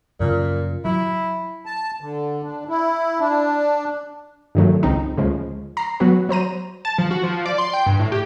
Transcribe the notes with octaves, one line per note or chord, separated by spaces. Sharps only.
F#2 A#2 C#3 F3
F#3 E4
A5
D3
D4
E4
D4
G2 D#3 F#3 A3
C#2 C4 D#4
D2 C#3 F3 G#3
A#5 C7
F#3 B3 F#4 B4
F#3 C5 A#5 D#7
A5
F3
F#4
F3
D5
C6
G5
G2
A2
G4